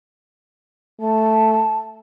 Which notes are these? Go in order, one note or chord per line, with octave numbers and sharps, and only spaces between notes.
A3 A5